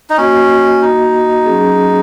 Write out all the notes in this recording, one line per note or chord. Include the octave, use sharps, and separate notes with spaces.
D#4
A#3 C#4 F#4 D#5
D#4
F#3 C#4 G#4